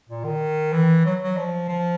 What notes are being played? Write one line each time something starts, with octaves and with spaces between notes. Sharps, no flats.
A#2
D#3
E3
F#3
F#3
F3
F3